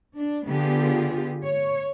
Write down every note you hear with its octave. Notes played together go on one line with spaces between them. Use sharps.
D4
D3 B3 F4 G4 G#4
C#5